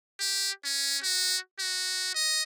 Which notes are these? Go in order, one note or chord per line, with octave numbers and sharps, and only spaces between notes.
G4
C#4
F#4
F#4
D#5